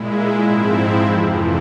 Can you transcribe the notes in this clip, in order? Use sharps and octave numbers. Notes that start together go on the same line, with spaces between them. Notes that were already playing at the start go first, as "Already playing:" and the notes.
Already playing: A#2 G#3 E4
G#2 F3 C4 E4
F2 C3 E3